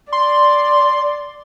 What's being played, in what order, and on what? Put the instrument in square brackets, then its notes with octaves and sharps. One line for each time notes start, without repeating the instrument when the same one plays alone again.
[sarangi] D5 [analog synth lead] C6